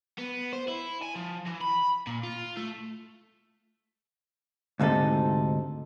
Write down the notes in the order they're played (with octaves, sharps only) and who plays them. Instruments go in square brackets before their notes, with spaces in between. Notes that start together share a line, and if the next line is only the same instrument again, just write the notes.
[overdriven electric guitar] B3
C5
E4
G#5
F3
E3
B5
A#2
F4
A3
[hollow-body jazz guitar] D2 G#2 C3 D#4 A4